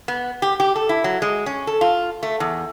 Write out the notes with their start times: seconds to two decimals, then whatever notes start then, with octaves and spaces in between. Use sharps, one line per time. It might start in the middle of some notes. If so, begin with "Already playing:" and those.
0.08 B3
0.42 G4
0.60 G4
0.76 A4
0.89 E4
1.04 F#3
1.22 G#3
1.46 C#4
1.67 A4
1.81 F4
2.23 A3
2.40 E2